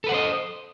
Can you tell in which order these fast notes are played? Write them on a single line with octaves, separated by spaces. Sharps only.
A4 B4 F#5 C5 D#5